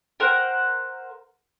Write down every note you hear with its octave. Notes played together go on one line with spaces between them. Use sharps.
A#4 C5 F#5